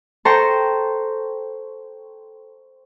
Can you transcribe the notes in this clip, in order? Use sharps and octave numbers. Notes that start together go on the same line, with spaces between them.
A4 C5 G5 A#5 C#6